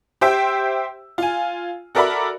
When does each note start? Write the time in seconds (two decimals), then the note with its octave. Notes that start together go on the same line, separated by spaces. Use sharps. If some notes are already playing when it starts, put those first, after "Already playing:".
0.21 G4 C5 E5 G5
1.18 F4 G#5
1.95 F#4 A4 A#4 D5 E5 B5